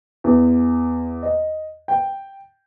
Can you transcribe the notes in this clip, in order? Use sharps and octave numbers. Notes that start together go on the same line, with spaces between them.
E2
D#5
G5